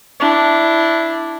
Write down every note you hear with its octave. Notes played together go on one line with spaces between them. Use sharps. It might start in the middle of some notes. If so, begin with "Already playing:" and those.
D4 E4